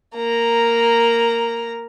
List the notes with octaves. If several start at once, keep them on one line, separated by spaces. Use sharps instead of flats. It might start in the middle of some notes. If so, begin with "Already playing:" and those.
A#3 A#5